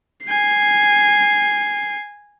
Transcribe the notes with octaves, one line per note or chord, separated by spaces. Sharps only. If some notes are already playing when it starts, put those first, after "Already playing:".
G#5 C7